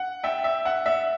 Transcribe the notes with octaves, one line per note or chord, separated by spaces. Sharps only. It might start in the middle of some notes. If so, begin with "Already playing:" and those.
Already playing: F#5
E5 G5
E5
F#5
E5